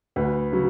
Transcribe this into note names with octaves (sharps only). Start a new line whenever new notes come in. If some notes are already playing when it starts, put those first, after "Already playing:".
D2 B4
C#3 F#3